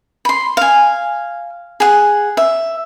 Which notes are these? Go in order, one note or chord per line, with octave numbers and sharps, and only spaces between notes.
B5 C6
F5 G#5
G#4 F#5
E5